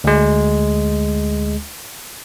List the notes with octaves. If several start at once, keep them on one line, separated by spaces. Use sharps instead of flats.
D2 G#3